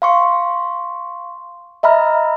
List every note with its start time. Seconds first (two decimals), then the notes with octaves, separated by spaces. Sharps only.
0.02 F5 C6 C#6
1.83 D#5 E5 A#5 B5 F6